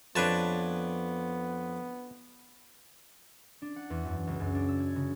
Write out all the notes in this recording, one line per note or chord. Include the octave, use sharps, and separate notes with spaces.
F2 B3 D4 B4 C#5 A5
D4
F#5
E2
F#2
C#2
F#2
D4
E6
G#6
C#3